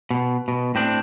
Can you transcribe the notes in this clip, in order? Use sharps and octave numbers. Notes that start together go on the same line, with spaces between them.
B2
B2
A2 C4 D4